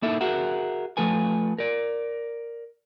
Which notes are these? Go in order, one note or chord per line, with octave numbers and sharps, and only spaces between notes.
A#3 D#4 E4 A4 E5
F#4 G#4 A#4 E5 F#5
F3 A3 A4 B4 G#5
A#4 D5